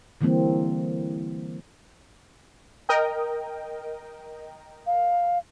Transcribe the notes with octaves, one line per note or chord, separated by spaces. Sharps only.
D3 E3 G3 A#3 C4
A#4 D#5 G5
F5